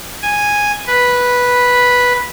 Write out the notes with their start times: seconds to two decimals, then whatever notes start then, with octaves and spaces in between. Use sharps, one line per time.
0.22 G#5
0.87 B4